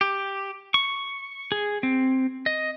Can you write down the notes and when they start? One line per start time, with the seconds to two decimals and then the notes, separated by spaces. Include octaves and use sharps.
0.01 G4
0.74 C#6
1.52 G#4
1.83 C4
2.46 D#5